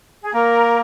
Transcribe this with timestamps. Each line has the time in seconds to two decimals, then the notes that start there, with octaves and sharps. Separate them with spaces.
0.22 G#4
0.33 A#3 A#4